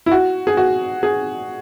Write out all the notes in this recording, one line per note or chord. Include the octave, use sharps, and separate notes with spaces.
E4
F#4
G#4
F#4
G#4